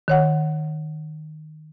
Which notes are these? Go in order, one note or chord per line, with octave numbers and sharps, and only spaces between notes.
D#3 C#5 F#5